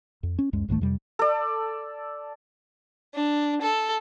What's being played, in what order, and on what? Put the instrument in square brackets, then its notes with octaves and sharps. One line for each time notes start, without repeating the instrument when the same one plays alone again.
[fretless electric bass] F2
C#4
C#2 F#2 G#3
C2 G#2 D#3 A3
F2 C3 G3
[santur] A4 D5
[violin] D4
A4